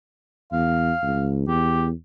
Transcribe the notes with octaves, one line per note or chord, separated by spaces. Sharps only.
E2 F5
C#2
E2 G4